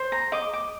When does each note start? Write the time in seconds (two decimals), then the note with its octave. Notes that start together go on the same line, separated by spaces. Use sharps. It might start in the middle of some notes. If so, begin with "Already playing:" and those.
Already playing: C5
0.12 A#5
0.32 D#5 D6
0.53 D6